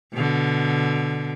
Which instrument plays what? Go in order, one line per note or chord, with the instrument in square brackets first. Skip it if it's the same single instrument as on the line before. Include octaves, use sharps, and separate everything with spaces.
[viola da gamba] B2 D3